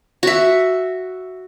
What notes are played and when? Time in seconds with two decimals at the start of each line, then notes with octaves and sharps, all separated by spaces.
0.23 F#4 E5